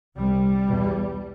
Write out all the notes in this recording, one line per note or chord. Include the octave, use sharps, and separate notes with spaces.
C2 C3 G3
E2 B2